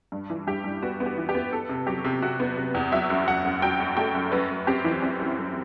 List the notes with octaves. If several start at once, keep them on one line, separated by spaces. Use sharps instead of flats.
G2
E3
G2 G4
G2
B3 F#4
B3
G4
E3
G4
B3
B3 A4
C3
F#3 G4
C3
C3 F#4
B3
C3
E2
F#3 E5
F#2
F#2 F#5
F#2
F#3 G5
F#2
A3 G5
F#2
F#2 B4
F#2
C4 G4
E3
C4
F#2
F#2